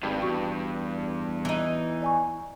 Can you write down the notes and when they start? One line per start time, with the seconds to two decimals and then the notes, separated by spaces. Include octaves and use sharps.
0.03 G#1 G2
0.22 E2 F#4 C#6
1.45 E3 D#4
2.02 D5 G#5 C#6